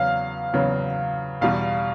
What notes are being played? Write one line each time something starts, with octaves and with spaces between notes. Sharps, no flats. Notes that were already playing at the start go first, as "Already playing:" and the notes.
Already playing: E2 C#3 F#3 B3 F5
E2 C#3 F#3 B3
E2 B2 G3 F5